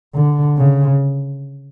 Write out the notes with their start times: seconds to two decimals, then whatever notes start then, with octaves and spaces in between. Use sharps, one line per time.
0.14 D3
0.56 C#3